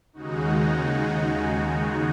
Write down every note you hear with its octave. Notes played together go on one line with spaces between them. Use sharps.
D#2 C#3 G#3 D#4 F#4